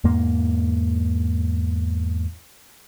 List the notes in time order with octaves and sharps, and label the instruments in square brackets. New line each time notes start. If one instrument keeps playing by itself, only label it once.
[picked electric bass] E2 G#2 A#3